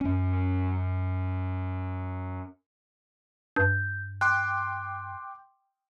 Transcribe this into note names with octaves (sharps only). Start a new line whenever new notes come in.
F#2 C#4
G2 G6
G5 C6 D6 F#6